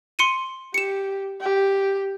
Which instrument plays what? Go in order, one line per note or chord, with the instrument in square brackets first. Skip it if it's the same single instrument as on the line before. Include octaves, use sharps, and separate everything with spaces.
[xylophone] C6 C#7 D#7
[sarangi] G4 [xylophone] C#7 E7
[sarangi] G4